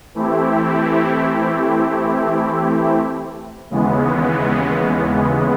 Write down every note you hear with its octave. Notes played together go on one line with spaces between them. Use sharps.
E3 A3 C4 E4 G4
D#2 C#3 E3 G#3 B3